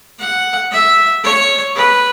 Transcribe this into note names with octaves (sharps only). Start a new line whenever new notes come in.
F#5
E5
C#5
B4